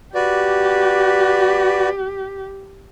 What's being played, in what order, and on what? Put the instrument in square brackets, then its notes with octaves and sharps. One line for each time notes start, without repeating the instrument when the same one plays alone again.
[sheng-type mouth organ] F#4 B4 D5 [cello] G4